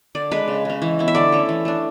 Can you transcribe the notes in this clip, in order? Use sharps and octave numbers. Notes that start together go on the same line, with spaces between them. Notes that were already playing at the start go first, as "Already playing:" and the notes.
D3 D5
G#3 D4 B4
C#3
G#3 C#4
E3
B3 E4
E5
D3 D5
A3 C#4
E3
A3 D4